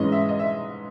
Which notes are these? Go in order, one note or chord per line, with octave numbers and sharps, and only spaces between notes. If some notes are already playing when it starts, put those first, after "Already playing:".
Already playing: G#2 E3 G#3 C#4 D#5
E5
D#5
E5